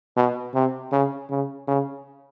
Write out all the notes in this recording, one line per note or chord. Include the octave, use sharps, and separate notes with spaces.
B2
C3
C#3
C#3
C#3